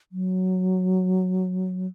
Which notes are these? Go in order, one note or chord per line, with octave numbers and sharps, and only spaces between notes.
F#3